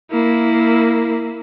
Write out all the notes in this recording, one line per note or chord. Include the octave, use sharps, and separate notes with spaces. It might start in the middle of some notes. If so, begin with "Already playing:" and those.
A#3 E4